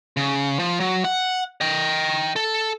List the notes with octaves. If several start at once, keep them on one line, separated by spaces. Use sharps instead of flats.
C#3
F3
F#3
F#5
D#5 G5
A4